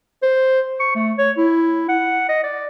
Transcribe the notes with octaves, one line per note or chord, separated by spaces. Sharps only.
C5
C#6
A3
C#5
E4
F#5
D#5
D5